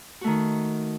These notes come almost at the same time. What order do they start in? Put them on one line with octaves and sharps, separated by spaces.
F#4 A3 D#3